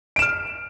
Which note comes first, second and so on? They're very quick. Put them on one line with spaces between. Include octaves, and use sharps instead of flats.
D7 E7 F6